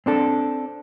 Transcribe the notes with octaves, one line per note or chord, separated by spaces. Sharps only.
C4 D4 A4